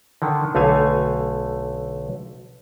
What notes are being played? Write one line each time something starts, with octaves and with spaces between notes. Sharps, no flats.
D3 D#3
B1 D3 A3 F5 G#5